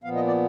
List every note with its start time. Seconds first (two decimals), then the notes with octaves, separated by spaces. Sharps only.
0.04 A#2 F3 B3 F5
0.15 D#5
0.27 D5